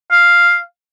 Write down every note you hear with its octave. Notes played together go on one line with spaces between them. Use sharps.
F5